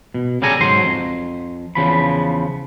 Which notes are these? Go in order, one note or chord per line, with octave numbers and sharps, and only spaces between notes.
B2
C#3 G3 G#4 A4 G#5 A#5
G#2 F#3 C5 C6
F2
E2 C#3 F3 B5